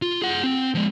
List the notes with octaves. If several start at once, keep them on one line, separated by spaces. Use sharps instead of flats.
F4
G#4 F#5
C4
F3 G#3